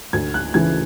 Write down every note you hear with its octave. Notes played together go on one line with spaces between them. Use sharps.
D2 G#6
F#6
C#3 E3 G#6